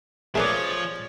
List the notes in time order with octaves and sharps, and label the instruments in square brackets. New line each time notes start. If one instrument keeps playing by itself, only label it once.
[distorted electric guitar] F3 [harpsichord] A3 A#3 B4 [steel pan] G#4 D5 [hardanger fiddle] C#5